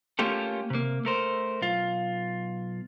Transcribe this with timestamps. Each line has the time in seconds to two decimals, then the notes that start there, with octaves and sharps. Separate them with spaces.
0.19 A3 A#3 C#4 F4 G4 A4
0.70 C3 A#3
1.05 A3 A#4 C5
1.62 B1 F4